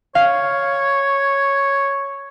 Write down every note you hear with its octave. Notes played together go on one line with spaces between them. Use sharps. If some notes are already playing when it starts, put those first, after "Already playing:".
C#5 F5